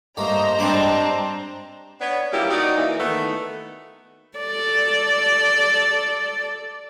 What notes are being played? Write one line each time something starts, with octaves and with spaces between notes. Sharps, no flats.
G2 A3 A#3 C5 D#5 A#5
G2 G#3 C4 D4 A5 B5
B3 D4 C#5
F#3 G3 A#3 C#4 E4 G4
D#4 F#4 D5
E3 A#3
D#3 A3 B3
A4 D5